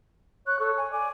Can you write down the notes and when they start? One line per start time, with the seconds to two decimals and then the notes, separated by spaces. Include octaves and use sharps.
0.47 C#5 F#6
0.60 A4 C#5
0.77 G#5
0.92 D5 G#5